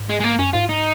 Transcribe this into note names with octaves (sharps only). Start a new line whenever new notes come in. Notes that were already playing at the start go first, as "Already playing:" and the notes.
Already playing: G#2
G#3
G#3
A#3
F#2 C#4
G#2 F4
D#4